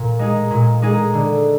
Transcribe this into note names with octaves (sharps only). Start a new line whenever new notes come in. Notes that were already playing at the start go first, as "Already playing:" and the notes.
Already playing: A#2
G#3 D#4 G#4
A#2
G#3 D#4 G#4
D3